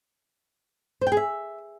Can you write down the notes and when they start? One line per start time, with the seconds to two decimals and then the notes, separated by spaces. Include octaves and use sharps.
1.01 C5
1.07 G5
1.12 G#4
1.17 E5